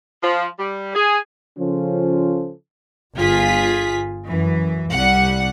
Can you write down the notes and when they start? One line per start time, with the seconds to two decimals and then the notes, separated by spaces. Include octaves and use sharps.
0.22 F3
0.59 G3
0.95 G#4
1.58 C#3 F3 C#4 F4 A4 C5
3.15 G1 F4 G#4 B6
4.28 F#2 E3
4.92 C2 G3 F#5